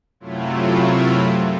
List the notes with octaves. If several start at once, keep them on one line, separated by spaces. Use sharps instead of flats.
F#2 C3 F#3 A3 E4 F4